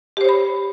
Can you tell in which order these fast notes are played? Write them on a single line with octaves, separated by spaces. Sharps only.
G4 C5 C#5 B5